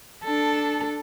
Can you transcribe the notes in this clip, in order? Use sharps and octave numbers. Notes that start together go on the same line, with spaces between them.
D4 A4